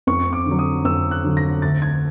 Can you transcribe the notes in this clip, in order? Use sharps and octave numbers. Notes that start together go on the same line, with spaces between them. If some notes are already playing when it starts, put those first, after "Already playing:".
F2 C#6
D6
D3
F#3
D#6
F2 E6
F#6
D3 F#3
A#6
D2 A6
G#6